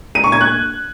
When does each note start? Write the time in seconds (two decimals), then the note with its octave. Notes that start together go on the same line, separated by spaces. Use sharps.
0.15 D#7
0.24 C#6
0.32 G#6
0.41 F#6